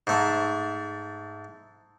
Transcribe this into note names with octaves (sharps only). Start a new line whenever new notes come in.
G#2 A3